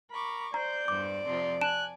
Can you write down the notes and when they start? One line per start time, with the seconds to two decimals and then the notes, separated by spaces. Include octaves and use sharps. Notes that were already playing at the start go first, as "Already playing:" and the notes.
0.11 A#4 B5 C#6 D6
0.54 C5 D5 A#5 G6
0.88 E2 G2 C5 D6
1.26 F2 C3 F3 C6
1.61 G#5 A5 F#6 D7 E7